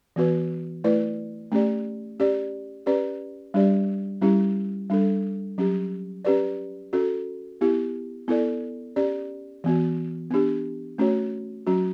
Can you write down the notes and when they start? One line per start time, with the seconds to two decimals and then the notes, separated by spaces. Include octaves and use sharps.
0.16 E3 B3 F#4 B4
0.84 A3 E4 B4 D5
1.52 A3 C#4 G4 D5
2.20 C#4 G4 D5
2.86 C#4 G4 B4 D5
3.54 G3 D4 G4 D5
4.21 G3 C#4 E4 G4
4.90 G3 D4 A4
5.58 F#3 C#4 G4
6.25 C#4 G4 B4 D5
6.93 C#4 F#4 A4
7.61 B3 E4 G4
8.28 B3 E4 A4 D5
8.96 C#4 G4 D5
9.64 E3 B3 F#4
10.31 B3 D4 G4
10.98 A3 C#4 F#4 C#5
11.67 F#3 C#4 F#4